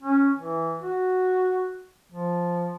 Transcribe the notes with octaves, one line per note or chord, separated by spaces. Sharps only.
C#4
E3
F#4
F3